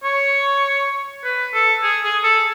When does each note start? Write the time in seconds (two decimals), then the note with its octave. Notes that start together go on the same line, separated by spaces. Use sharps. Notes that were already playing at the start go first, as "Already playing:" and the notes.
0.04 C#5
1.24 B4
1.54 A4
1.83 G#4
2.04 G#4
2.23 A4